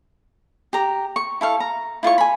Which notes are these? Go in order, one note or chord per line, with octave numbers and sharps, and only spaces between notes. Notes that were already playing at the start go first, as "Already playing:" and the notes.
G4 A#5
C#6
E4 A4 F5 C#6
A#5
E4 F4 C#5 C#6
G#5 B5